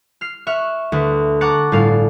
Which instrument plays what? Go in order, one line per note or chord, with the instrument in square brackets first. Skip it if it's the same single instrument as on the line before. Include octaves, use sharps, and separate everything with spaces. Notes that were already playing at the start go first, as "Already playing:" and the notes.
[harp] F6 C7
E5 C#6 F6 F#6
D2 B4
F#5 A5 A#5 C#6 D6 F#6
G1 A2 D5 F5